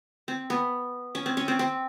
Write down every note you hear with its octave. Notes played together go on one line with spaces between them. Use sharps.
C4
B3
C#4
C4
C#4
C4
C4